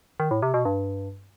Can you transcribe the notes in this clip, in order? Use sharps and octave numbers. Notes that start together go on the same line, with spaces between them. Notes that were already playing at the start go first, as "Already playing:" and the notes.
D#3
A2
C3
B2
G2